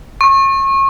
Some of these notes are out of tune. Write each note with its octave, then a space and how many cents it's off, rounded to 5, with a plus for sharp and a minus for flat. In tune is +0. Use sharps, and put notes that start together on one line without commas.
C#6 -30